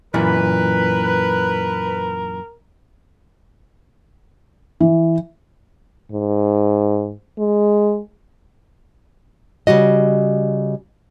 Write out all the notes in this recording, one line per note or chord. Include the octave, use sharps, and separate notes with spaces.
F#2 A#2 E3 A#4 B4
E3
G#2
G#3
C#3 G3 F#4 D#5